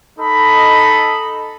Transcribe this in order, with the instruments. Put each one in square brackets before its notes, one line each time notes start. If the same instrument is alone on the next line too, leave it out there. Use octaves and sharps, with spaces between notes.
[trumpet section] D#4 A4 D#5 B5